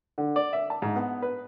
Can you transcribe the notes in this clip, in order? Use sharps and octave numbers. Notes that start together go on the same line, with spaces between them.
D3
D5
E5
A5
G#2
B3
B4